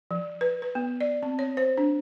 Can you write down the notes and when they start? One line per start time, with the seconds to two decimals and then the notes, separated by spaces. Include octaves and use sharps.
0.11 F3
0.41 B4
0.62 B4
0.75 B3
1.01 D5
1.23 C4
1.39 C#5
1.57 C5
1.77 D4